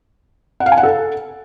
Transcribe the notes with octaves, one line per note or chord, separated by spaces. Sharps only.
F#5
F5
G#5
F#5
A4